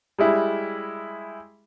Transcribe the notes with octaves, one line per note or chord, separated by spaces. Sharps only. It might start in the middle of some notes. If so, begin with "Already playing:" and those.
G3 G#3 E4